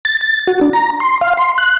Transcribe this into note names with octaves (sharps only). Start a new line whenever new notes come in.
A6
A6
F#4
D4
A#5
C6
F5
C6
F#6